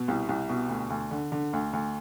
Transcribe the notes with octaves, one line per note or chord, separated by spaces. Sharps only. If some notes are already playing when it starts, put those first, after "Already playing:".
Already playing: B2
C2
C2
B2
D2
D2
D3
D3
D2
D2